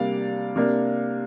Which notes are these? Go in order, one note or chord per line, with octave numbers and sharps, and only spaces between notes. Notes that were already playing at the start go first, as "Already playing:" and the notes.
Already playing: C3 G3 A#3 D4 D5 F5
C3 A#3 D4